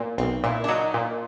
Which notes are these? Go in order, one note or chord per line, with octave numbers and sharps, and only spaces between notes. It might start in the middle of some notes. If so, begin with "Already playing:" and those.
Already playing: A#2
B1 C4
A#2 E4
D4
F#3 D#4
A#2